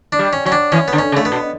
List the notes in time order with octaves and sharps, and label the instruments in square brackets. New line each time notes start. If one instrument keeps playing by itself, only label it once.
[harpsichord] D4
[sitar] G3
[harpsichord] C#4
[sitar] F#3 [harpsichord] C#4
[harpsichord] D4
[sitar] E3 [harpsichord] C#4
[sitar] D3 [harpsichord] B3
[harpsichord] C#4
[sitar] C#3
[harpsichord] A3
B3
[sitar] B2